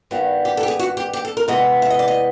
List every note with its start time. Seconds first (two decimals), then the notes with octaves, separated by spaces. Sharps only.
0.11 G2 D#3 G3 B3
0.45 G4
0.57 A4
0.63 G4
0.68 G#4
0.79 F#4
0.97 G4
1.13 G4
1.25 A4
1.37 A#4
1.48 C3 E3 G#3 B3 D#5
1.82 E5
1.90 D#5
1.99 D5
2.08 D#5